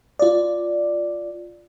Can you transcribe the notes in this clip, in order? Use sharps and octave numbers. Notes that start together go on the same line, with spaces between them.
F4 D5